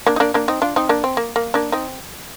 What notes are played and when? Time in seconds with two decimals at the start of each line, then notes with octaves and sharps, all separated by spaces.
0.06 A#3 D4
0.16 D#4
0.20 A#3 D4
0.34 A#3 D4
0.48 C4 D#4
0.62 D4 F4
0.76 C4 D#4
0.89 A#3 D4
1.04 C4
1.17 A#3
1.36 A#3
1.54 A#3 D4
1.72 C4 D#4